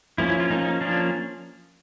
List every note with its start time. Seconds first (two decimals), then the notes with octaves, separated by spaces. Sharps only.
0.18 F3 A#3 C#4 E4
0.29 E4
0.40 F4
0.50 F3 A#3 C#4 D#4
0.65 D#4
0.81 F3 A#3 C#4 D4